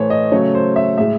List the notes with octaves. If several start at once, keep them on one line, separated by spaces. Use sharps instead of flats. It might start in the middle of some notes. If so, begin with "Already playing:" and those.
Already playing: A2 E3 A3 C5 C#5
D#5
C#3 F#3 A3 C#5
C5
E5
A2 G#3 E5